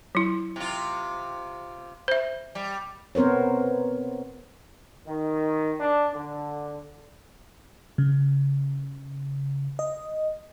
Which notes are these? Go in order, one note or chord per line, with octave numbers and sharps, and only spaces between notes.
F#3 E4
C3 F4
C5 E5
G3
B3 C4 A#4 C5 C#5
D#3
D4
D3
C#3
D#5